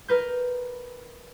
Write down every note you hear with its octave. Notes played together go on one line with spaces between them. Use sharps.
A#4 B4 G6